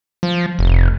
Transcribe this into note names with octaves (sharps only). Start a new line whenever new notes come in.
F3
F1